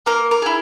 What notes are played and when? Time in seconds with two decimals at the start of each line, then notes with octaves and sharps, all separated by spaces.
0.06 A#3 A#4
0.31 A#4
0.42 E4 G#4